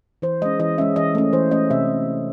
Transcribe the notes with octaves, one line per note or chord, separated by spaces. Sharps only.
E3 C5
G#3 C#4 D#5
E3 D#5
G#3 C#4 E5
E3 D#5
A3 C#4
E3 C5
A3 C#4 D#5
C3 E5